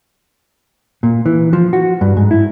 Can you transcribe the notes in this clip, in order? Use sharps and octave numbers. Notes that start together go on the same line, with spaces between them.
A#2
E3
F3
F#4
G2
G#2
E4